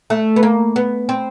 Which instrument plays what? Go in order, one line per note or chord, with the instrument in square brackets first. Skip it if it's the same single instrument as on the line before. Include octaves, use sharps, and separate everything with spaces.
[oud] A3
B3
A#3
B3
C4